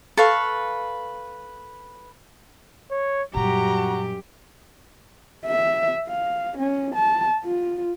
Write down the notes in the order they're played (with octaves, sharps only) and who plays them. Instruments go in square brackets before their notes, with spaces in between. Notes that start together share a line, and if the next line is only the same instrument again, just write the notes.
[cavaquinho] A4 B4 F5 C#6
[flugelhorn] C#5
[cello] F#2 G4 [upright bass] A#2 G3 [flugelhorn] F#4 [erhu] A#5
[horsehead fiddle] E5
F5
C#4
A5
F4